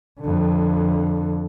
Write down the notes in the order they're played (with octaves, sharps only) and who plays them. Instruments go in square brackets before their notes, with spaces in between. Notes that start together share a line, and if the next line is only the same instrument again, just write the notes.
[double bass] F2 D3